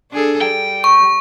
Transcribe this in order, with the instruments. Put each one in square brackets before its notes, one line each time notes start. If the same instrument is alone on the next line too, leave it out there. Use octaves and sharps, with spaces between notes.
[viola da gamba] D4 G#4 A4
[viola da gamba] G3 [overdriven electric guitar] G5
[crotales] C#6